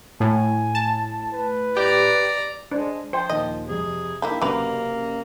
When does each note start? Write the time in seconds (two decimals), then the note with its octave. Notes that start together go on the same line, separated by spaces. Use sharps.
0.20 A2 G#5
0.75 A5
1.33 B4
1.77 G4 D5 A#5
2.71 G#3 D4 C5
3.13 F3 C5 E5 G5
3.29 D#2 A#2 D#5
3.68 F2 C3 G#4
4.22 D#3 A#3 D4 E4 G4
4.42 F#1 C3 F#3 A#3 B4 D6 F7